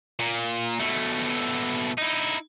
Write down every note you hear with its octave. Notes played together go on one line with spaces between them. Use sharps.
A#2
B2 A3
D#4 E4